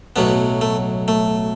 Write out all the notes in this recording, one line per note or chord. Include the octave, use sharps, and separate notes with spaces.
B1 A2 F#3 B3
A3
A3